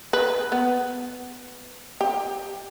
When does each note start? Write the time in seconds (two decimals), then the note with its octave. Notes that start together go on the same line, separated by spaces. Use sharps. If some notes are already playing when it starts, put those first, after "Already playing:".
0.13 B4
0.52 B3
2.01 G4